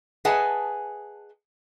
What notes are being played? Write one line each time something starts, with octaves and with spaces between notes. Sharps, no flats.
G#4 B4 D#5 F#5 G#5 A5